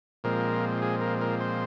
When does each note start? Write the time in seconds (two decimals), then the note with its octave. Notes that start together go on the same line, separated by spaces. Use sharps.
0.24 A#2 F3 G#3 C4 A#4
0.82 G#4
1.01 A#4
1.21 A#4
1.41 C5